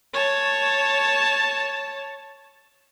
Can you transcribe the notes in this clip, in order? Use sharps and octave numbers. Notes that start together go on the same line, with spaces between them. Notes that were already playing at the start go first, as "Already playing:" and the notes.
C#5 A5